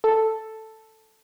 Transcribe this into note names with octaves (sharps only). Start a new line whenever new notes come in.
A4